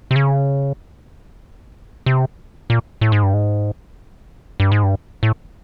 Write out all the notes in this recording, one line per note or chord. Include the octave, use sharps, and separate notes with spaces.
C3
C#3
C3
A#2
A2
G#2
G2
G#2
G2
G#2
G2
A2